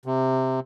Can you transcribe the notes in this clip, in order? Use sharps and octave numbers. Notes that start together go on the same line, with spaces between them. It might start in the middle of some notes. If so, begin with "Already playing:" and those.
C3